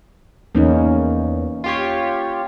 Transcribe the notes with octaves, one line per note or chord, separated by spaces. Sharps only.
E2 A#3 C#4 D#4
F4 G4 C#5